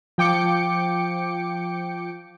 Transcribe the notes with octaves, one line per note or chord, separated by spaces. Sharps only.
F3 G5 D6 C#7